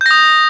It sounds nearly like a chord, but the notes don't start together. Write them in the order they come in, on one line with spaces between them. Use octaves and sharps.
G6 A#6 D#6